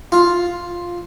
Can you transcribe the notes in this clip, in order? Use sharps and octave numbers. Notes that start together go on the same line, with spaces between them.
F4